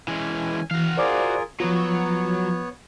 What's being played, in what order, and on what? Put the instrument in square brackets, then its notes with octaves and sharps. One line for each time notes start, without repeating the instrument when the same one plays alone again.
[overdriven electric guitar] E3 G#3 [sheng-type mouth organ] C#4 G#5
[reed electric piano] E3 [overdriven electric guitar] F#4 F5
[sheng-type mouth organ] F4 G#4 A#4 [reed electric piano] C5 D5 D6
[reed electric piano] F3 F4 [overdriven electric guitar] F#3 [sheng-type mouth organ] B3 C#5